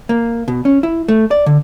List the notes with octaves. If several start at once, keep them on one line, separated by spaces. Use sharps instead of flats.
A#3
B2
C#4
E4
A3
D5
D3